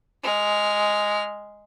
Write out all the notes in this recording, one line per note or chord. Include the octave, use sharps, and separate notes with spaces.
G#3 F6